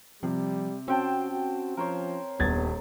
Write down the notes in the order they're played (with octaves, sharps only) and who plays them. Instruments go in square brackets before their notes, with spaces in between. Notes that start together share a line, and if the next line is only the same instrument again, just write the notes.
[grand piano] C3 [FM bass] F3 [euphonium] G3
[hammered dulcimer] C4 G5 A5 [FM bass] C#4 [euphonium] F#4
[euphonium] F#4
[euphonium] F3 [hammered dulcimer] A#4 C5 C#5
[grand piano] D#1 G#6 A6 [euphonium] G2 [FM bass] B3